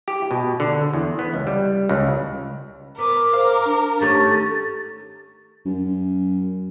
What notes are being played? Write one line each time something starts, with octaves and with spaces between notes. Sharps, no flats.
G4
B2
D3
E2
B3
C#2
G3
C#2
B3 A#4 D6
C5 F5
D4
D#3 A3 C#4 G4 A6
F#2